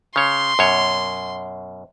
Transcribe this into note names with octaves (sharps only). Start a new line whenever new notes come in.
C#3 C#5 C6
F#2 B2 C#5